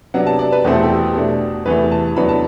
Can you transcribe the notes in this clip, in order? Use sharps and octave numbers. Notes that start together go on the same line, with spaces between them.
C3 F#3 B3 D4 F#5
A5
D5
B4
E2 B2 A3 C4 G4
A4
G4
B2 A3 D4
E2 C3 E3 A3 B4
A5
E2 C3 F#3 B3 D4 B5
A5